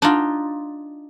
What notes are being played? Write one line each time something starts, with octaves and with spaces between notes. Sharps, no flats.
D4 D#4 F4